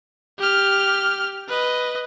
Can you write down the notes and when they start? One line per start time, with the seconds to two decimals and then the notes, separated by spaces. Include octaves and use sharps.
0.39 G4 F6
1.48 B4 D#5